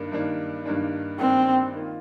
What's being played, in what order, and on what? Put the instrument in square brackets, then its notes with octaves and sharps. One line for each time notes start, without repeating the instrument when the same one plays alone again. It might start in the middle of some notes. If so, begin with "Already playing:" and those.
Already playing: [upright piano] G2 D#3 A#3 D4
G2 D#3 A#3 D4
G2 D#3 A#3 D4
[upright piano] G2 D#3 A#3 D4 [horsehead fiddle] C4
[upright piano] D#3 A#3 F4